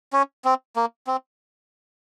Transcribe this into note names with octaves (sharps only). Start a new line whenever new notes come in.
C#4
C4
A#3
C4